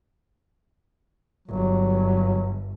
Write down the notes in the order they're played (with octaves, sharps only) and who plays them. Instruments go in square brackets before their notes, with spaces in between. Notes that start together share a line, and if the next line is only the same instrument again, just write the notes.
[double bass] G1 [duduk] F#3